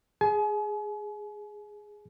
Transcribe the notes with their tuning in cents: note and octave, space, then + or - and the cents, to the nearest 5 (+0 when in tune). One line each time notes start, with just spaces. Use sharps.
G#4 +0 G#5 +40